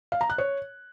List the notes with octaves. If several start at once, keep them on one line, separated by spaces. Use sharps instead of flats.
F5
A#5
F#6
C#5